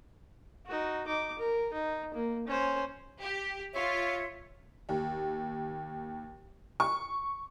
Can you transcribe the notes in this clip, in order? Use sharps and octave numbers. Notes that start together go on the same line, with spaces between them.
D#4 F#4
D#4 D6
A#4
D#4
A#3
C#4 C5
G4
F4 C#5 E5
D#2
C#6